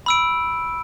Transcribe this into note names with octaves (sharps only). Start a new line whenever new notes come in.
B5 E6 D7